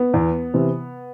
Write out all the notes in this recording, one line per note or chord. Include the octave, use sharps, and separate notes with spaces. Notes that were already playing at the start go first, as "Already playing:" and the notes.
Already playing: B3
E2
C3 E3